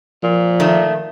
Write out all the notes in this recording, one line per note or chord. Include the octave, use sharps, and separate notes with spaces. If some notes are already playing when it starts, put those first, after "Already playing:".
A#2 F3
D#3 A3